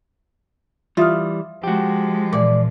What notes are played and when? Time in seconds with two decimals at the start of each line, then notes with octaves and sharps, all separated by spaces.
0.97 E3 G3 F4 E5 D#6 F6
1.64 F3 G#3 F#4 G4
2.33 A#2 E3 D5